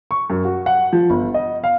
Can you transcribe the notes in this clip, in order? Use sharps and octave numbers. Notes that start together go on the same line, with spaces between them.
C#6
F#2
F#4
F#5
F3
G1
D#5
F5